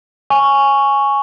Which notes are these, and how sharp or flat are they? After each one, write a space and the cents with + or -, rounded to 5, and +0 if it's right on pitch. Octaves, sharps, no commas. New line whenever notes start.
G#5 +0 C#6 +0